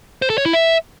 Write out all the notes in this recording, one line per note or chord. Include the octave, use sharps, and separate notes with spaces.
C5
A4
C#5
E4
E5